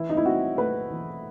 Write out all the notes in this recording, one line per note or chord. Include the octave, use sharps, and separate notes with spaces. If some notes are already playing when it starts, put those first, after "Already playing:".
Already playing: E3 E4
D#4
E4
C4 F#4
A3 B4
E3